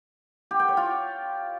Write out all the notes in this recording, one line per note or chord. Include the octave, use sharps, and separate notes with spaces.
G4
G5
C#5
F4